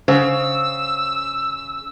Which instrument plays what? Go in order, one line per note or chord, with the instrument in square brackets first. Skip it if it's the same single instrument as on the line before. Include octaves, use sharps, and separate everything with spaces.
[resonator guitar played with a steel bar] C#3 [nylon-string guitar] C5 F#5 [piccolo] E6